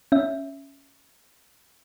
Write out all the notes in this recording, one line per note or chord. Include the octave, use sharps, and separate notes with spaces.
C#4 E5